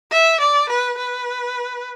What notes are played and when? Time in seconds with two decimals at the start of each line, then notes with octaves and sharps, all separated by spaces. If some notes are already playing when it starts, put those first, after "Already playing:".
0.12 E5
0.40 D5
0.69 B4
0.98 B4